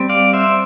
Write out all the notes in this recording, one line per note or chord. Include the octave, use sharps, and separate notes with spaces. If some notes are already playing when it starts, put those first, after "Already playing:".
Already playing: G3 C4
D5 F5
C5 E5